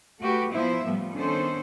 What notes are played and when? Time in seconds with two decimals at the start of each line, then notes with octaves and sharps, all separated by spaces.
0.20 A3 F#4 G4 B4
0.51 F3 B3 E4 C5 E5
0.83 A2 F3 G3 B3
1.14 D#3 B3 C#4 D4 A4 C5